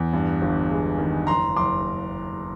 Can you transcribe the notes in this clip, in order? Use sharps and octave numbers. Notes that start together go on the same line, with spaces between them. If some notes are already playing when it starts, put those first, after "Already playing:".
Already playing: E2
G2
G1
G#3
D#3
F#1 A#5 C6
F#1 C6 D6